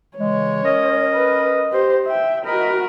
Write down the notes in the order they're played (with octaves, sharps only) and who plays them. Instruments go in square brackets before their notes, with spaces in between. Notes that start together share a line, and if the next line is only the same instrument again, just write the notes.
[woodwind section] C#3 E3 G#3 [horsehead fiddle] C#5
[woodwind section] C#4 A#4 D#5
[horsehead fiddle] B4
G4 C5
E5 G5
[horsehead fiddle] F#4 A#4 [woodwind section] D#5 B5